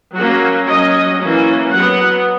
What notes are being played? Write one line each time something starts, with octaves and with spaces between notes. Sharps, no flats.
F#3 A#3 C#4 F#4
F#3 C#4 D#5
E3 A#3 C#4
F#3 B3 F#5